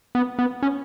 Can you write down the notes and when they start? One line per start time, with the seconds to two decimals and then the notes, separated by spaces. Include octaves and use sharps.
0.15 B3
0.39 B3
0.63 C#4